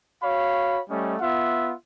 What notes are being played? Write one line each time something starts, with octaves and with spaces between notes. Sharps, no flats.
F#4 C#5 F5 B5
G3 A3 C#4 D#5
B3 F4 E5 F#5